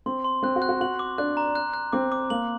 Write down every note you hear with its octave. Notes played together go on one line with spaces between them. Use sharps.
C4 C6
C6
C4 F#6
F#4
F#6
F#4
F#4 F#7
D6
D4 F#6
A#5
F#6
F#6
C4 D6
D6
A#3 F#7